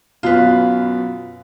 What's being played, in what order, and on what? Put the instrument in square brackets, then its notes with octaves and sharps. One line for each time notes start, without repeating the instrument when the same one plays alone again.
[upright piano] F#2 B2 [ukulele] F4 B4